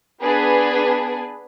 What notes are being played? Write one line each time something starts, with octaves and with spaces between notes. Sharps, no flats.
B3 D4 G#4 B4